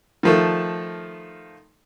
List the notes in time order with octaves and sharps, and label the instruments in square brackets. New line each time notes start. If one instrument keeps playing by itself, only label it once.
[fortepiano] D#3 F3 A3